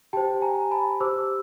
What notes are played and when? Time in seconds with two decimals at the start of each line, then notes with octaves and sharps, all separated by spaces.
0.13 G4 C5 G5 A5
0.42 G#5 A#5
0.71 A5 B5
1.00 G4 C5 D6 E6